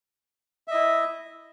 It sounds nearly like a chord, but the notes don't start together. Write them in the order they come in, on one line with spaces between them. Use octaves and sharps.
E5 D#5 E4